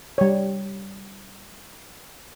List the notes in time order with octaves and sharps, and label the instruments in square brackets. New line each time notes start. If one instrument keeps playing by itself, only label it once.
[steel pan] G3 C#5